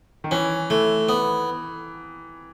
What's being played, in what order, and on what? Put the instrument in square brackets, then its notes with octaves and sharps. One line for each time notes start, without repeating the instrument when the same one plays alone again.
[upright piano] D#3
[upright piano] E3 [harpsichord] C#4
[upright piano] E3 [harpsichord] A3
[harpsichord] B3